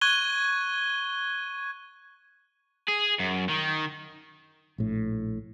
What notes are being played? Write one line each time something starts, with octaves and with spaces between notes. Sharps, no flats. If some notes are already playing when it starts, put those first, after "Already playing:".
C#6 F#6 G#6 D#7 G7
G#4
F#2
D#3
A#1 A2